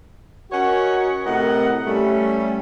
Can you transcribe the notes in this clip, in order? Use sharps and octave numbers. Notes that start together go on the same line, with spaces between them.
C#4 F#4 A#4 C#5 D#5 F#5
A2 C3 A#4 D#5 F#5
G3 A3 C#4